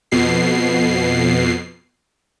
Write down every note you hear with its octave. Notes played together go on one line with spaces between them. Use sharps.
F2 B2 C7